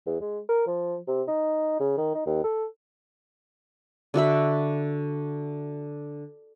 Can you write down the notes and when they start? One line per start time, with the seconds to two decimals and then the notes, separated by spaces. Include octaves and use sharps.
0.06 E2
0.21 G#3
0.49 A#4
0.67 F3
1.07 C3
1.28 D#4
1.80 C#3
1.97 D#3
2.15 D#4
2.26 D#2
2.43 A4
4.14 D3 F#4 E5 B5